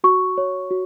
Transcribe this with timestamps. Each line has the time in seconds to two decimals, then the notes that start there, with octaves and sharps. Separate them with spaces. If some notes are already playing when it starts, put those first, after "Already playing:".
0.04 F#4 C#6
0.38 C#5
0.71 F#4